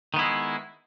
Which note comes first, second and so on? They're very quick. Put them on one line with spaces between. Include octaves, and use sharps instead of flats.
D#3 B3 E4 G#3